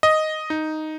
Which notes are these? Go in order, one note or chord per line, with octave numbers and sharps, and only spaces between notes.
D#5
D#4